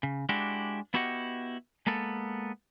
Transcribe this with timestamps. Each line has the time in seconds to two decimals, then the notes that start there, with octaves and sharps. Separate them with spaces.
0.03 C#3
0.29 G#3 D4 E4 F#4 G4
0.94 B3 E4 F#4 G4 D#5 F#5
1.87 G#3 A#3 B3 A4